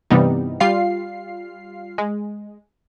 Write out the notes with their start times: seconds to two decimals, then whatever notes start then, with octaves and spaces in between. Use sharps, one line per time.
0.10 G2 C3 E3 G3 B3 D#4
0.60 G3 F4 F5 C7
1.98 G#3